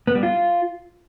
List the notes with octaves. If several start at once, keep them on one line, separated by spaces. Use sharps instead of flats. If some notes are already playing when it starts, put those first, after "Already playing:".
B3
G3
F4